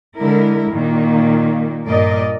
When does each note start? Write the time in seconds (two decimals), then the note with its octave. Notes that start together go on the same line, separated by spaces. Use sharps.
0.19 D3 G#3 E4 A#4
0.71 A#2 D#3 A#3
1.86 G2 A#2 A#4 D5 D#5